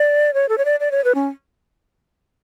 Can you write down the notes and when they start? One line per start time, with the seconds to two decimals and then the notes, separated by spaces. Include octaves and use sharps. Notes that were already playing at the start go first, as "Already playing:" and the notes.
Already playing: D5
0.34 C#5
0.49 A4
0.58 C#5
0.65 D5
0.80 D5
0.91 C#5
1.04 B4
1.15 C#4